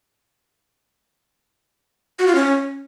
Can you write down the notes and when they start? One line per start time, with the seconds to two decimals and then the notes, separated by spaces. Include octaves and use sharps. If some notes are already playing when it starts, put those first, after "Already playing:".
2.19 F#4
2.27 F4
2.35 C#4